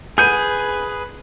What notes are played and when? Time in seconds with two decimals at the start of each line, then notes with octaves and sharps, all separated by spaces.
0.18 G#4 B4 G6 D#7